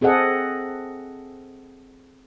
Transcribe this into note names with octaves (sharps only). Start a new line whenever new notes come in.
C4 G#4 A4 D#5 F#5